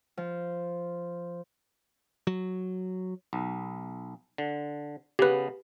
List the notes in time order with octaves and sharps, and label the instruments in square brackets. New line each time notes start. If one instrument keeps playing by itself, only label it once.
[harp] F3
[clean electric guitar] F#3
[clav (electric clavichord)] B1
D3
[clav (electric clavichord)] C#3 B3 [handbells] G4 B4